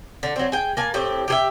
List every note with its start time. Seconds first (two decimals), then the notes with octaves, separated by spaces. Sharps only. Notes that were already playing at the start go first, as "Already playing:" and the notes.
0.23 D3
0.36 F#3 C4
0.52 G#4 G5
0.77 A#3 G#5 A5
0.94 A2 C4 G4
1.28 G4 G#4 E5